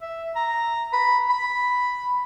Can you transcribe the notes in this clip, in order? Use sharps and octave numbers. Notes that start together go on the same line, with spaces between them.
E5
A#5
B5
B5